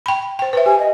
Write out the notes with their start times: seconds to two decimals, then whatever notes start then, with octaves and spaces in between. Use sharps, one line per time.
0.06 G5 B5
0.39 C5 G5
0.53 B4 C5 E5
0.66 G4 G#5
0.79 D#5